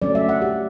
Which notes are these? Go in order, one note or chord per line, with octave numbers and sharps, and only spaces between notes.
F#3 A3 C#4 D5
E5
F#5
G4